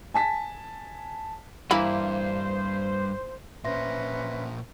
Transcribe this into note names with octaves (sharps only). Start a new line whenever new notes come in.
G#5 A5 B6
G2 E3 A#3 E4 C5 B5
A#2 C#4 B4 C5 E5 C6 A#6